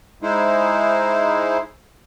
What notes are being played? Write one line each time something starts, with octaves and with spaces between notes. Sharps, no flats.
G#3 D#4 E4 C5